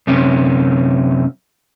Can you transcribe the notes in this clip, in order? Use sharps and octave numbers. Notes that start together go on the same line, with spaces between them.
F#2 C3 C#4